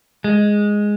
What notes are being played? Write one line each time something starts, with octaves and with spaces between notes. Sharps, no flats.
G#3